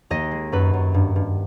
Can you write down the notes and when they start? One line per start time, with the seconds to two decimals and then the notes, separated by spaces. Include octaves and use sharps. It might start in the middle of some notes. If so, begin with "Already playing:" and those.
0.10 D#2 D#5
0.31 G#3
0.52 F#2 B4
0.74 F#2
0.94 G2
1.16 G2